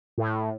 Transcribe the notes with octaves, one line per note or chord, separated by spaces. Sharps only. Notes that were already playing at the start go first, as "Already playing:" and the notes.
A2